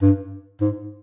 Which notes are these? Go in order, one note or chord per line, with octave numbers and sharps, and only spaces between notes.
G2
G#2